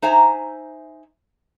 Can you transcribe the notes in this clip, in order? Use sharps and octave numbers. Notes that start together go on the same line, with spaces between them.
D#4 C5 E5 G#5 A#5